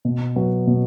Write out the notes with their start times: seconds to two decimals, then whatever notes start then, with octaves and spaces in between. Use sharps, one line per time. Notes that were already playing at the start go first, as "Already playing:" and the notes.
0.05 B2
0.36 F#3 B3 F#4
0.67 B2